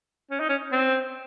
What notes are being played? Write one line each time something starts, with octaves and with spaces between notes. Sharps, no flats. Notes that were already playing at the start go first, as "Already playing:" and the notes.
C#4
D#4
C#4
C4